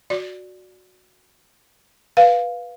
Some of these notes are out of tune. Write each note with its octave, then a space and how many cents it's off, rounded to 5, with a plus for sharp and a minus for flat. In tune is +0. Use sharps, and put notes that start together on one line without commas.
F#4 -10 D5 +0
B4 -10 F5 +0